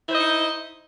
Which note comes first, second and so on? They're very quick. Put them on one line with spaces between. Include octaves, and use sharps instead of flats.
E4 C5 D#5 D#4